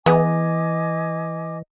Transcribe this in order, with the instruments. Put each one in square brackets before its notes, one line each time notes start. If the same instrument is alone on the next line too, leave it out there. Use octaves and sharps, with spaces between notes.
[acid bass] E3 [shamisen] B3 G#4 [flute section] D#5 G#5 D6